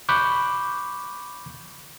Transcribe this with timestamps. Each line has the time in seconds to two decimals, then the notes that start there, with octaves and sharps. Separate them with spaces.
0.09 B5 C#6 D6 F#6 G6